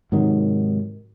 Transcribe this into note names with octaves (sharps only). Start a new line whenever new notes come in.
G#2 C3 D#3 F#3